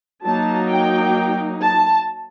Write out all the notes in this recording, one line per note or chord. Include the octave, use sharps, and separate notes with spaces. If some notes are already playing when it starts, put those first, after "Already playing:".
F#3 A#3 D#4 A5
G5
A5